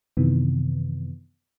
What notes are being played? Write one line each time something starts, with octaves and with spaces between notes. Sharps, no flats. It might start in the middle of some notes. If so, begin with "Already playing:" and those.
F#2 C3 D#3 E3 B3